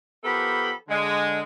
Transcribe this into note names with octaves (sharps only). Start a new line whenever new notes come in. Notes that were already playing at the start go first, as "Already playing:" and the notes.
F3 B3 G4 A4 A#4 B5
D3 G#3